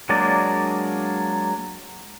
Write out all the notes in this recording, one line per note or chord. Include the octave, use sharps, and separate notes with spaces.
F#3 G#3 A#3 D4 D5